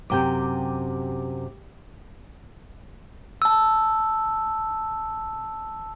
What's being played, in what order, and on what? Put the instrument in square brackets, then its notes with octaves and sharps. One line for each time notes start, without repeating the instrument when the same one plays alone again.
[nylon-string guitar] F#2 C3 [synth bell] G4 G5 D6
[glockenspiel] A5 E6